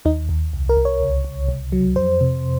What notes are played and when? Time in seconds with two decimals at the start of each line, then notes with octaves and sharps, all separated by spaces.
0.05 D#2 D#4
0.29 D#2
0.53 C2
0.69 A#4
0.77 C2
0.85 C#5
1.00 C#2
1.25 C#2
1.48 C2
1.72 F#3
1.96 F2 C5
2.21 C3